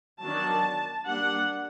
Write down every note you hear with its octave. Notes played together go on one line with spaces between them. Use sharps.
D#3 F#3 B3 D4 A5
G3 A#3 D4 F#5